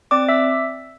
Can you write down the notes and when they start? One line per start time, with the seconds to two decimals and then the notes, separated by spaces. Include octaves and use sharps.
0.11 C4 D5 D6
0.29 E5 E6